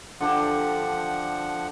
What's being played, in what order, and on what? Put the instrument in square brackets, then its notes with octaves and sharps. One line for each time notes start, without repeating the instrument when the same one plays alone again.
[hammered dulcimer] D3 D4 G4 [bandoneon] F3 F#5